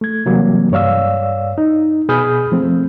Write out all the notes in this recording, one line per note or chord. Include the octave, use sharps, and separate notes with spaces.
A3 G#6
C3 E3 F#3 G3 A#3
G2 C#5 D5 F5 E6
D#4
B2 G#4 B5 D#6 F6 G6
F3 A3 C4